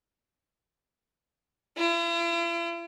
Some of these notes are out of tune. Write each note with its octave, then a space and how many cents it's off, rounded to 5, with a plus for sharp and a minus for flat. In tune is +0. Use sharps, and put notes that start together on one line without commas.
E4 +45